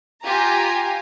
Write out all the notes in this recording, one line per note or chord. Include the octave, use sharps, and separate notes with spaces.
F4 G4 G5 G#5 A#5